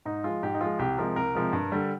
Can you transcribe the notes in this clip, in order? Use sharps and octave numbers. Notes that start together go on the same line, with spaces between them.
G#2 D#4
F3 G#3 F4
G#2 G4
D#4
F3 G#3 F4
C2 G4
C3 F3 G#3 A#4
C2 A#4
C3 F3 G#3
G2
D3 G3